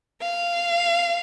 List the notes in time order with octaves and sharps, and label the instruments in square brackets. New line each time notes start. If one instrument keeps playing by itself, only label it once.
[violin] F5